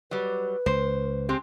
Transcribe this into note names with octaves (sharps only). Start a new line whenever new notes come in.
F#3 G3 B4
C#2 C5
G#3 C4 G4